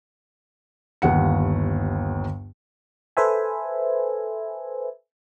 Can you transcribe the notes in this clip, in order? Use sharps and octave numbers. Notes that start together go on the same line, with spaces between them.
G1 D#2 F#5 C#7
A4 B4 C5 E5 G#5